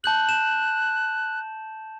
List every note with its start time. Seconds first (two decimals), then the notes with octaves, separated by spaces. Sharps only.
0.04 A5 F#6 G6 F#7
0.29 E7